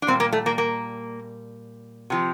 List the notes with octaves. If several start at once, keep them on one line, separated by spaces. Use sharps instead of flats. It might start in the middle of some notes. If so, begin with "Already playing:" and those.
D4
A#2 G3 C4
A#3
A3
A#3
A#3
C3 F3